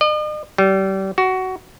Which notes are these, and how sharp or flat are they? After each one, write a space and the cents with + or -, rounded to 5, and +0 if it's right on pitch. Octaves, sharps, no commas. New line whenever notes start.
D#5 -45
G3 -30
F#4 +15